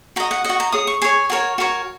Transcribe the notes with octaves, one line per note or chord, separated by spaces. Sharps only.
F#4 D#5 A#5
F#5
F#4 D#5 F#5
A#5
G#4 C#5 D#6
C#6
G#4 C#5 G#5
F#4 A#4 C#5
F#4 A#4 C#5